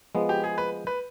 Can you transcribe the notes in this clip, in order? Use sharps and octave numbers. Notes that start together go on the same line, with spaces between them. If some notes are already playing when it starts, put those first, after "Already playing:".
F3 G#3 B3
G4
G#4
B4
B4